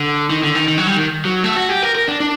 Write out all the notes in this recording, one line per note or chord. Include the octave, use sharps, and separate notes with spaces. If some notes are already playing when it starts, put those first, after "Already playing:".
Already playing: D3
D#3
D3
D#3
D#3
F#3
G3
D#3
F#3
A3
F#4
G4
A#4
A#4
D4
D4